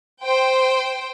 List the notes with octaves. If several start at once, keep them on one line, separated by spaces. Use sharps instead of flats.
C5 G5